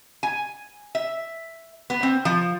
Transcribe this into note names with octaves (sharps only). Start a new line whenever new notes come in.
G#5
E5
B3
C4
F3